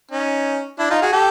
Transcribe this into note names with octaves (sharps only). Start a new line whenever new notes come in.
C#4 D#4
D4 E4
D#4 F4
F#4 G#4
G4 A4